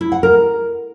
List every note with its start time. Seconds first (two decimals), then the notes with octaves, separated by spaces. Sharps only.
0.01 E4
0.12 F#5
0.23 A#4